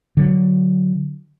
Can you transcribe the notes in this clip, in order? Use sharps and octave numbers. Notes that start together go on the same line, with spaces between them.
D3 F#3